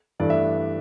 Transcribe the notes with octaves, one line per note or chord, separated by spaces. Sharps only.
G2 E3 A3 D4 D5
E5